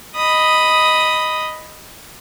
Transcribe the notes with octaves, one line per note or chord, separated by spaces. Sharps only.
D#5 B5 D#6